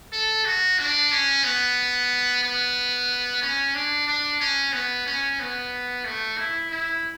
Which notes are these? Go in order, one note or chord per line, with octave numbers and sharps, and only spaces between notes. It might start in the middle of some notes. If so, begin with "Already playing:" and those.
A4
F#4
D4
C#4
B3
B3
C#4
D4
D4
C#4
B3
C#4
B3
A3
E4
E4